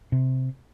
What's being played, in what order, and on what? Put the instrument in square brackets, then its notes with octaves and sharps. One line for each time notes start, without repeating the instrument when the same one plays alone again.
[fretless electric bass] C3